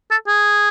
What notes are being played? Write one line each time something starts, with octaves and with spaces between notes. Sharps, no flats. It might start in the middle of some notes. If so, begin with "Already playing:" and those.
A4
G#4